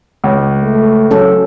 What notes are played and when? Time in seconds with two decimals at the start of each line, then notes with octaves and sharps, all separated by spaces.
0.24 C#2
0.63 A3
1.11 F#3 C#4 A4